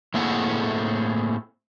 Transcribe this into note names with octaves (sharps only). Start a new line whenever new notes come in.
A2 A#3 C4 G#4 A4 F#5